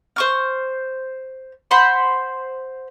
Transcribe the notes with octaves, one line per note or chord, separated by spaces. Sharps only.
C5 C#6 F6
C5 F#5 B5 C6